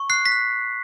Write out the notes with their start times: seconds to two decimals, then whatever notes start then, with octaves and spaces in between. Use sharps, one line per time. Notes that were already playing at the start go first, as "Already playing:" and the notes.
Already playing: C#6
0.10 F#6 C7
0.26 B6
0.32 F#6